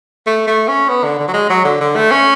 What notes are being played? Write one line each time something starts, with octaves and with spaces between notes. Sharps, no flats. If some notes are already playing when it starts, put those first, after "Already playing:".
A3
A3
C#4
B3
D3
D3
F#3
G#3
F#3
D3
D3
A3
C#4